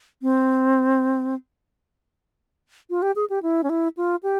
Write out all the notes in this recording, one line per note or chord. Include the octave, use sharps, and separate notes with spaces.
C4
F4
G4
G#4
G4
E4
C#4
E4
F4
G4